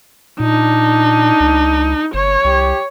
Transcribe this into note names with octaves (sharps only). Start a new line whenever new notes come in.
A#2 D4 D#4
C#2
G1 C#5
C2 G4